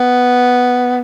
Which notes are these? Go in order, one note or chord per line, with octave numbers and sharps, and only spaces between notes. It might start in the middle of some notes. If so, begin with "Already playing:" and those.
Already playing: B3